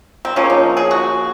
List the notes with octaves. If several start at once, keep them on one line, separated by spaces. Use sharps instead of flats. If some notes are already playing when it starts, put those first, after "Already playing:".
C4
C#3 F3 A#3 C#4
D#4
G#4
F#4